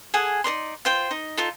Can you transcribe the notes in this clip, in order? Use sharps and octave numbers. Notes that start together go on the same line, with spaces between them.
G#4 A4 F#5 G#5
D#4 A#4 D5 C6
F4 C5 G5
D#4
D#4 F4 A4